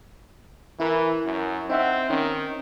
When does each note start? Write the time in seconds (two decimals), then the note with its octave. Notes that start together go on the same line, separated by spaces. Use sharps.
0.80 E3 E4 A#4
1.25 F#2
1.69 C4 D#4 E5 F#5
2.10 D#3 C#4